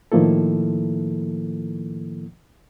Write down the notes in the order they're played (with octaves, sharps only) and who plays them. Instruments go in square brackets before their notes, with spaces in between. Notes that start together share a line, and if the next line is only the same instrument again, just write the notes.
[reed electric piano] A2 D#3 F3 A#3 E4 A4